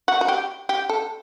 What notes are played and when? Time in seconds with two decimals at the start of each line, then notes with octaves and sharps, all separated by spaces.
0.08 F#4
0.21 F#4
0.28 G4
0.69 G4
0.89 A4